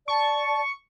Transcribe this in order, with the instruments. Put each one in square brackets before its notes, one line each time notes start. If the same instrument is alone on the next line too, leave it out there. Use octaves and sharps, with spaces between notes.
[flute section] D5 A5 [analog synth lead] C#6